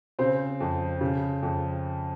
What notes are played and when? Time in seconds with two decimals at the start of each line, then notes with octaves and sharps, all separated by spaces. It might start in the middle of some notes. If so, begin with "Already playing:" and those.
0.19 C#3 C4 C5
0.60 F2
1.01 C#3
1.43 F2